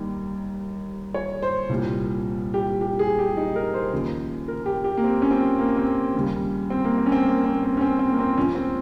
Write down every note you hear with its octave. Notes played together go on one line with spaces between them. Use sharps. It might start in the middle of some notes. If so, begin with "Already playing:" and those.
Already playing: D#2 D#3 G3
C#5
C5
C2 A#2 G3
G4
G4
G#4
G4
D#4
A#4
C5
D#2 C#3 F3
A#4
G4
G4
A#3
C4
C#4
C4
A#3
C4
D#2 C#3 G3
C4
A#3
C4
C#4
C4
A#3
C4
C4
C#4
C4
C4
A#3
C4
C#2 C#3 F3 C#4
C4